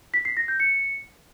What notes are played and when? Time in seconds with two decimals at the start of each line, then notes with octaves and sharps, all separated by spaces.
0.14 B6
0.25 C7
0.37 A#6
0.48 G6
0.60 C#7